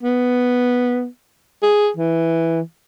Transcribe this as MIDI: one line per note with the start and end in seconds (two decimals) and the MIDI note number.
0.03 1.06 59
1.63 1.89 68
1.97 2.61 52